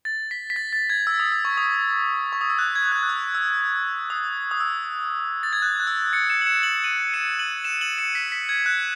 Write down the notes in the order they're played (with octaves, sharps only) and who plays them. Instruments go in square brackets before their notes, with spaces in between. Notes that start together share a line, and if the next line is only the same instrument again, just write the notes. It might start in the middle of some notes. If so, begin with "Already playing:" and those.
[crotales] A6
B6
B6
A6
A6
G#6
E6
D#6
E6
C#6
D#6
C#6
D#6
E6
F#6
G#6
F#6
F#6
E6
E6
D#6
D#6
E6
A6
G#6
F#6
F#6
E6
A6 C#7
C#7 E7
F#7
C#7 E7
F#7
D#7 F#7
C#7 E7
D#7 F#7
C#7 E7
D#7 F#7
C#7 E7
B6
B6
G#6
F#6